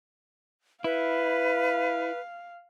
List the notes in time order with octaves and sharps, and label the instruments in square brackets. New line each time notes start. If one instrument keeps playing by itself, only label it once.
[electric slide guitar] E4 [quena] B4 [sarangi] F5